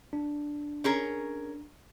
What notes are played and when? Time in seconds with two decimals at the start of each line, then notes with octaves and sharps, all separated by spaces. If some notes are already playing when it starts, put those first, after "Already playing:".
0.13 D4
0.84 C#4 G#4 A#4